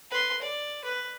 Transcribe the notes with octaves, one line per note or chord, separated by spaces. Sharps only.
B4 C6
D5
B4